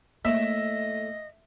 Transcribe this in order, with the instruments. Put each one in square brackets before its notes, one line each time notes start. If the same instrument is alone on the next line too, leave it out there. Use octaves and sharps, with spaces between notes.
[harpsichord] A2 A3 [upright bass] A#3 [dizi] D#5 [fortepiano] E5